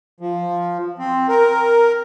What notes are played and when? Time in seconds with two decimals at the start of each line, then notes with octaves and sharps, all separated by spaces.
0.20 F3
0.99 C4
1.29 A#4